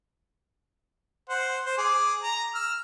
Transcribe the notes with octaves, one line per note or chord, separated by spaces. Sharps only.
C5 F#5
C5
G#4 D6
A#5
E6 F6